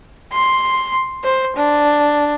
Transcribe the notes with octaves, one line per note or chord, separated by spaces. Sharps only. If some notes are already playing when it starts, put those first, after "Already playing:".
C6
C5
D4